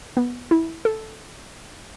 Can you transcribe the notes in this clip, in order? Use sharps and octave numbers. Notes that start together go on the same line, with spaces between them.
B3
E4
A4